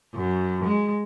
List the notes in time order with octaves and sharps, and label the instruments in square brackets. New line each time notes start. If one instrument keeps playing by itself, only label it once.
[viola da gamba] F#2
G#3